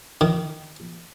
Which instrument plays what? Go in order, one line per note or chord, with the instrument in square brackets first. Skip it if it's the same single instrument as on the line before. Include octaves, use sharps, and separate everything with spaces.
[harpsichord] D#3